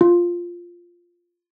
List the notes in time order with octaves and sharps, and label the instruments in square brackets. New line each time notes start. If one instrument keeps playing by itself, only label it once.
[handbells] F4